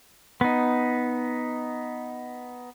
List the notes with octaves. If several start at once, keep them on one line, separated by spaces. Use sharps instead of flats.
B3 D#4